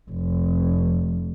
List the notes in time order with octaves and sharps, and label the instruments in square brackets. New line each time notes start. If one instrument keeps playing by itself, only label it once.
[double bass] F1